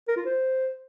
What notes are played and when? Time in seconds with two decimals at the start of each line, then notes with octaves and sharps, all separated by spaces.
0.08 A#4
0.17 F4
0.26 C5